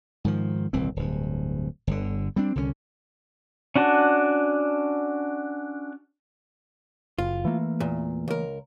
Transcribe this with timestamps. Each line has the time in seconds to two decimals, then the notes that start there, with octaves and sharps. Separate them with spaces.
0.25 G#2 D#3 F3
0.73 D#1 C2 E3 C4
0.96 D1 G2
1.87 G1 D3
2.36 G3 C4 D4
2.55 C2 D3 F3 C#4
3.76 C#4 D4 F#4 A5
7.18 F#1 F4
7.45 E3 A3 A#3
7.80 E2 A#2
8.28 C#2 A#4